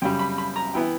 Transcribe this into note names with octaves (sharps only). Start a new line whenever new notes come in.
F#2 C#3 G3 G5
B5
B5
A#5
E3 B3 E4 G5